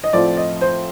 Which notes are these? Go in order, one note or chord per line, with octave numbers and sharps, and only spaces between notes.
D#5
A2 F3 C4 F4 D5
D#5
C5